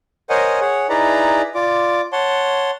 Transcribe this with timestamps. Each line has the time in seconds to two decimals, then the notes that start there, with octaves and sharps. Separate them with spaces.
0.30 A#4 C5 C#5 D#5 F#5 G#5
0.60 G#4 C#5 F#5
0.89 D#4 E4 G#4 B4 D5 A#5
1.55 F4 D5 D6
2.12 C#5 F#5 A5 C6